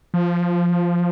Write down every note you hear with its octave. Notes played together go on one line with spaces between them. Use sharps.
F3